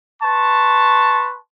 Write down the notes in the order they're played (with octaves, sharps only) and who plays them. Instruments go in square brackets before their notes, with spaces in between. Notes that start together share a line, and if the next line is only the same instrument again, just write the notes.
[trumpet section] B4 A5 C6 C#6